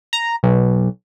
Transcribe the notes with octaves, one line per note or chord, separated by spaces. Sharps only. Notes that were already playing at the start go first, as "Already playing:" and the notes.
A#5
B1